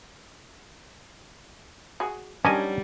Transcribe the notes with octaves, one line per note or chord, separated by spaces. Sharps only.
F#4 G#4
D#3 F#3 G3 C#4 D4 D#5 G#5